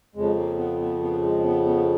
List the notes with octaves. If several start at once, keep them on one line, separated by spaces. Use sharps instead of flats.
F2 C#3 F3 G#3
A#3
B3
B3
B3
G#3
B3
B3